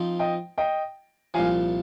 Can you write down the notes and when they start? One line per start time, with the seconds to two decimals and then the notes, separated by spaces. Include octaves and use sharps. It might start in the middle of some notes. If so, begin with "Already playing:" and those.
Already playing: F3 C4 D#4
0.19 D#5 G5
0.58 D#5 G5
1.34 C2 A#2 F3 F5 G#5